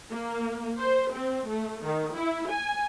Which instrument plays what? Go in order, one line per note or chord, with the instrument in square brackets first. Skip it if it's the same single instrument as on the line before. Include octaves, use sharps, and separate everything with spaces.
[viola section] A#3
C5
C4
A3
D#3
E4
G#5